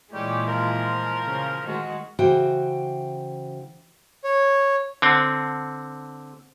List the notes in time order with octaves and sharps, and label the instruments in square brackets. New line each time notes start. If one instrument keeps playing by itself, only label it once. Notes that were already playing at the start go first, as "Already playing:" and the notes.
[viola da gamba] A#2 E3 G#3 [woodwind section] G3 C#4 G4
[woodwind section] F3 A#4
[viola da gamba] C#3
D#3 G#3 F#4
[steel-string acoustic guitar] C#3 E3 F#4 C5 G5
[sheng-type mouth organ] C#5
[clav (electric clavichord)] D3 C4